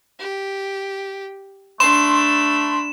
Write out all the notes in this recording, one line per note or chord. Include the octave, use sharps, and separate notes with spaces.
G4
A3 D4 B5 C6 E7